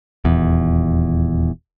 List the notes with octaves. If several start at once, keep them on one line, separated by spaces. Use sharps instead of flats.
D#1 E2